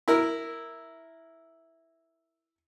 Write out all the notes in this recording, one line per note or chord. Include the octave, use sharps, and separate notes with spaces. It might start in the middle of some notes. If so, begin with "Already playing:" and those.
E4 A#4